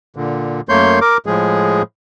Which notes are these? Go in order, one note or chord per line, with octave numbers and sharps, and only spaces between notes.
A#2 D3
F#2 A3 A#3 C#5 C6 G6
A#4 D6
A2 F3 G#3 G#4